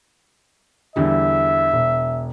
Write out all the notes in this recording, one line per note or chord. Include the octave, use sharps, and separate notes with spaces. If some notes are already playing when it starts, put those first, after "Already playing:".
E2 D3 G3 E5
E1